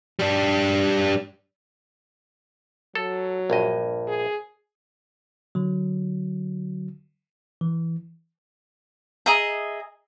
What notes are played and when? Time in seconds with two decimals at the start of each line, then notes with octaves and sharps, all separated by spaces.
0.19 G3 D4
2.95 F#3 A4
3.50 A#1 G2 D#5
4.07 G#4
5.55 D3 F#3
7.61 E3
9.26 G#4 D#5 E5 A#5